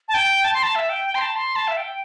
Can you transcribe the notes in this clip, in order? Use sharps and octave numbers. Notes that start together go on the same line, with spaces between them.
A5
G5
A5
C6
A5
E5
G5
G5
C6
A5
C6
A5
E5
G5